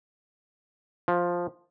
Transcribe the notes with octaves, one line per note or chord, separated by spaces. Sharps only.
F3